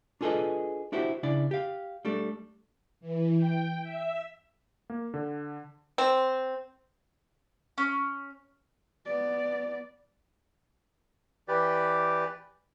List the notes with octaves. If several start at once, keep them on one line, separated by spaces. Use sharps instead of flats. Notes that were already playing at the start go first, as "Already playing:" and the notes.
D4 F4 G#4 A4 B4 D#5
D4 E4 F#4 G4 C5
C#3 D4 E4 D5
G4 F5
G3 A3 D4 A4
E3
G5
E5
A#3
D3
C4
C#4
B3 D5
E3 G4 B4 D5